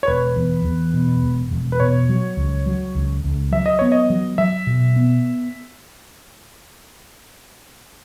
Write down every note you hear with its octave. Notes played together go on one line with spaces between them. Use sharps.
C#5
E1 B4
E2
E2
B2
E1
E1
B4
B2 C#5
F#3
C#2
F#3
C#2
C#2
F#3 E5
D#5
B3 C#5
D#5
F#3
F#3 E5
B2
B3